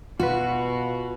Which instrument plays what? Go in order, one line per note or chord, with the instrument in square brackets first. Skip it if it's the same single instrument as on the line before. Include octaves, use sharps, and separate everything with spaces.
[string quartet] B2 [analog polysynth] F4 B4 [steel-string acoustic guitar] F#4